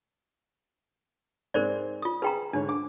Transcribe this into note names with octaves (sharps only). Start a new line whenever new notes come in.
G#2 C4 A#4 C5 D5
F4 D#6
G#4 B4 G5 A#5 B5
G#2 D3 D4 C#5
D6